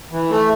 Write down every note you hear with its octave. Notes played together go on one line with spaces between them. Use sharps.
E3
A3